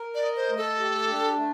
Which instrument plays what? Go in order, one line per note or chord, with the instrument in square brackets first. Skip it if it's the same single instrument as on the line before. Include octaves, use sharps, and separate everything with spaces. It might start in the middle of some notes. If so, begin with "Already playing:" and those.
Already playing: [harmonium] A#4
[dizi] D5
[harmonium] D#5
[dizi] C5
[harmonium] A3
[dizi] A4
[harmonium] G4
D4
A3